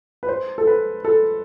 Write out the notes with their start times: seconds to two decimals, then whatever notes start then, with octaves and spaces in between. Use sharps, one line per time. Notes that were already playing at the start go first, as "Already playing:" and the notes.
0.23 B4
0.29 C5
0.58 A4
0.67 B4
1.05 A4